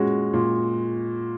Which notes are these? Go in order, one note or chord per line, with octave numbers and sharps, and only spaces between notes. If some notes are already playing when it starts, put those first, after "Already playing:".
Already playing: A#2 G#3 C#4 F#4
A#2